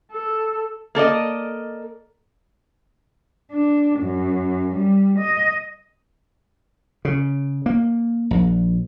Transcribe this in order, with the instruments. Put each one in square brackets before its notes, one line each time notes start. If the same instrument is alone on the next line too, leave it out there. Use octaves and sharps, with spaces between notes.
[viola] A4
[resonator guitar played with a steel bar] A#3 A4 D5 D#5
[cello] D4
F#2
G3
D#5
[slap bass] C#3
A#3
A#1